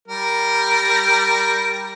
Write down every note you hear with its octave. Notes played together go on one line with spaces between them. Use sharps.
G3 A#4